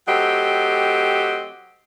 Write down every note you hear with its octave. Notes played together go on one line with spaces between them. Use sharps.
F#3 A3 C4 G4 D#5